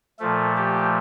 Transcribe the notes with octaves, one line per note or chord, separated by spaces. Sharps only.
A#2 F3 A3 A4
G4